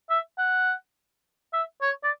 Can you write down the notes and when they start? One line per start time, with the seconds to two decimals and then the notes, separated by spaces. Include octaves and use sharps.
0.10 E5
0.38 F#5
1.53 E5
1.81 C#5
2.04 D5